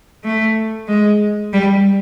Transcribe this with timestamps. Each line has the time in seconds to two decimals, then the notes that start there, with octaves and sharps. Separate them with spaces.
0.24 A3
0.88 G#3
1.53 G3